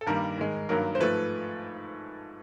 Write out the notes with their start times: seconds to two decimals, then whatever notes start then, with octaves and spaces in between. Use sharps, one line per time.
0.01 A4
0.07 G2 D#3 G3 A#3 A#4
0.37 G#2 D#3 G#3
0.69 G2 D#3 F#3 A#3 A#4
0.95 C5
1.00 G#2 F3 A3 B4